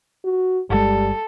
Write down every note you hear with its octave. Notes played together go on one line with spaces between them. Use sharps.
F#4
G1 G3 G#3 A4